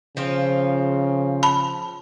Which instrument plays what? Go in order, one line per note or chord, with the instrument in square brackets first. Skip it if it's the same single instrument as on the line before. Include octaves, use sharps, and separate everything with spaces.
[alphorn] C#3 [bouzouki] F3 C4 F4
[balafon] A5 B5